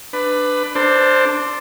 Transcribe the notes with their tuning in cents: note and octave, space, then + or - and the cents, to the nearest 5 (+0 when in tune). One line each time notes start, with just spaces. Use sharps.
D4 +15 B4 +15
D4 +0 A4 +40 C5 +0